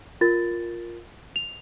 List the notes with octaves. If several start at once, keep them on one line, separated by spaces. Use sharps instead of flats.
F4 A#4 A6
F7